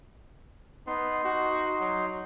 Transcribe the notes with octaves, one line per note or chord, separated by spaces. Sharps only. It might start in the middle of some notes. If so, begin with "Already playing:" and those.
B3 D#4 C6
F#4
F#3